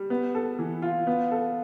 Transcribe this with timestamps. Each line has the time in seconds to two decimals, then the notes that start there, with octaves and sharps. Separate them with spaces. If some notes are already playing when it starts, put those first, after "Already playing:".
Already playing: G3
0.10 B3
0.35 A4
0.59 E3
0.82 F4
1.07 B3
1.31 A4